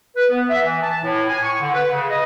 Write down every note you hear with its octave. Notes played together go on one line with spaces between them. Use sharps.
B4
B3
E5
E3
A5
A2
G#5
C#6
D3
B4
C#3
D#5